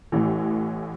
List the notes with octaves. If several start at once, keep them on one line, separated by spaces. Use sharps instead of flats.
A1 A2 E3